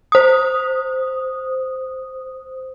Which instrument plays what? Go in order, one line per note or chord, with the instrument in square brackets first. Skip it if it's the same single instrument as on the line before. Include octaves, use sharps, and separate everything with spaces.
[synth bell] C5 D#6